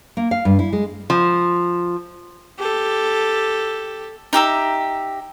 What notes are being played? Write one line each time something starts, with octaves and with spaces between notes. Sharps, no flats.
A#3
F5
G2
E4
G#3
F3
G4 A4
D#4 G4 E5 A#5